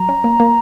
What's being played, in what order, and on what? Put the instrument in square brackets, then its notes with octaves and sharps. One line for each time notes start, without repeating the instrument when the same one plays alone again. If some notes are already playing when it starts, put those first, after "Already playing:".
Already playing: [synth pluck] F#3 [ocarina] A#5
[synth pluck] C#4
A#3
A#3